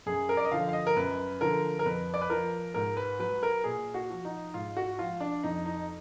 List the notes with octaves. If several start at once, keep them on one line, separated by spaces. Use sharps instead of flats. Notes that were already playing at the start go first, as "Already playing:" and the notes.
F#2 G#4
A#4
D5
D#5
D3 F3 F5
F5
D#5
A#4
F#2 B4
D3 F3 A#4
A#4
F2 B4
D5
B4
F3 A#4
G#2 A#4
B4
F#3 B4
A#4
A#2 G#4
F#4
F3
D#4
G#2 F4
F#4
F3 F4
D4
F2 D#4
D#4